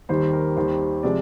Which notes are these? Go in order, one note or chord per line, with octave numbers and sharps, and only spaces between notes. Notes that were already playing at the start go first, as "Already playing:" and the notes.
D#2 D#3 G3 C5
A#4
D#2 D#3 G3 C5
C3 F3 G#3 D5